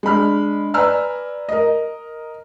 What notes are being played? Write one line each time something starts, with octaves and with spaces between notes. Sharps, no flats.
G#3 D4 B5 F6
B4 D5 G#5 A#5 E6 F6
A#4 D#5